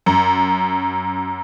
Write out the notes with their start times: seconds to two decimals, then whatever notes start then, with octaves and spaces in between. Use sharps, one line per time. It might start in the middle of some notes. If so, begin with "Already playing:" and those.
0.06 F#2